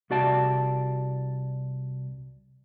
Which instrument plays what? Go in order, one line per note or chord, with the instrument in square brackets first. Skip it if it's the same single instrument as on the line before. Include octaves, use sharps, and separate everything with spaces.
[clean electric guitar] C2 F#4 D5 A5